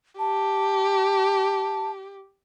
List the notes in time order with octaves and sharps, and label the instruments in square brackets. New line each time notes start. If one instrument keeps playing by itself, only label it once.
[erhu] G4 [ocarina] A5